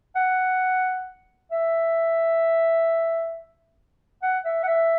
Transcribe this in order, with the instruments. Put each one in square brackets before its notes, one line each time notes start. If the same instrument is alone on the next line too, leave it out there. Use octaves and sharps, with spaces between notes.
[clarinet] F#5
E5
F#5
E5
F#5
E5